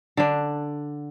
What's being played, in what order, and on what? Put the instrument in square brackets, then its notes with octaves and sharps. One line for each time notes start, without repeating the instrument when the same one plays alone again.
[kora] D3 D4